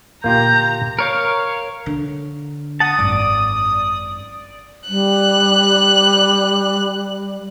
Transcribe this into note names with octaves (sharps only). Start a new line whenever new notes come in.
A#2 D3 A#3 F4 G4 A#5 G6
A#4 C#5 F5
D3
F#5 A5 D#6
G#1 F#2 D5
G3 F#6